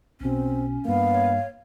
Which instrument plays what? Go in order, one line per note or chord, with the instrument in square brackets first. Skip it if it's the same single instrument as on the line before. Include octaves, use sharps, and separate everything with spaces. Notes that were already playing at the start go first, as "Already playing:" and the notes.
[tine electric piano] B1 B2 [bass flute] C4 [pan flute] C#4
[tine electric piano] G2 A#3 [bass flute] B3 [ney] F5
[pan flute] C#5